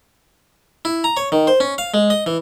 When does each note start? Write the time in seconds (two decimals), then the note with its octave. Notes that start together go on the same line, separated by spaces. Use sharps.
0.85 E4
1.04 A#5
1.17 C#5
1.32 D#3
1.47 C5
1.60 C#4
1.78 F5
1.94 G#3
2.10 D#5
2.26 E3